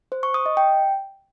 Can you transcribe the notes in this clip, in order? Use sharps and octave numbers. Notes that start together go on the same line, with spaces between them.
C5
C#6
D#6
D#5
G5